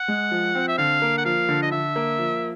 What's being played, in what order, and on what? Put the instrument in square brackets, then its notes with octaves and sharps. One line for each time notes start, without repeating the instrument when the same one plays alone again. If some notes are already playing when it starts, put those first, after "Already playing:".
Already playing: [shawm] F#5
[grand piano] G#3
F3
C4
[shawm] E5
[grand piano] D3 [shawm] F5
[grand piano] A#3
[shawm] F#5
[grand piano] F3 [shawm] F5
[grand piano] D3
[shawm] D#5
[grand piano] D3 [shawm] E5
[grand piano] A#3
F3